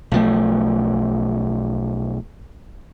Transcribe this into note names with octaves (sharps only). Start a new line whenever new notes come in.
B1 F3 A3